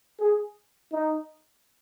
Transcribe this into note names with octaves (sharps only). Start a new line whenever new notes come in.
G#4
D#4